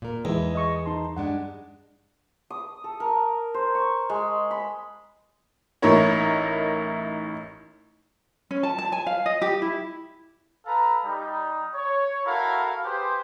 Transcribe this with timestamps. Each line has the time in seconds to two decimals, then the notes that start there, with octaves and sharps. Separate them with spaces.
0.02 A#2 A#4
0.25 E2 G#3 D#4 E4
0.55 D#5 C#6
0.86 D#4 A5 C6
1.17 G2 G#3 D4 F#5
2.50 D#6
2.84 A4
3.00 A#4
3.54 C5
3.75 C#6
4.10 G#3
4.51 B5
5.82 A1 D#4 E4 A#4 C#5
8.51 C#4
8.63 A5
8.78 A5
8.92 G#5
9.07 F5
9.26 D#5
9.42 G4
9.62 E4
10.66 A4 B4 F5 A#5
11.05 G3 D#4
11.75 C#5
12.25 E4 F#4 A4 A#4 F5
12.85 G4 G#4 B4 C5